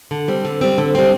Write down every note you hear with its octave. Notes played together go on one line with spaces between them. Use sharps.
D3
G3 C4
D3
G3 C4
D3
G3 C4